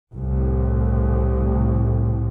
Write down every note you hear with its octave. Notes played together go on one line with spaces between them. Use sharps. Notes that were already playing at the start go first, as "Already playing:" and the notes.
C2 A2